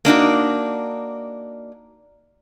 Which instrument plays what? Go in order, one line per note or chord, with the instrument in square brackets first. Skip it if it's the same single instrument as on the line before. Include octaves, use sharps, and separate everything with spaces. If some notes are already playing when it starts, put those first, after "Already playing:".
[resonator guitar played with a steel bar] A#3 D4 D#4 F#4